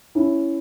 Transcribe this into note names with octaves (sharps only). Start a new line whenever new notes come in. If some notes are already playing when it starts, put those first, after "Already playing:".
C#4 E4